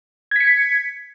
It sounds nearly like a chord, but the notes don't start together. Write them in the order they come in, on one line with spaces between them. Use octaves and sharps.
G#6 B6 C#7